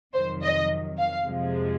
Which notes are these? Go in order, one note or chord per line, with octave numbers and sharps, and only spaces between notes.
F2 C3 D#3 F#3 C5
D#5
F5
F2 C3 F3 G#3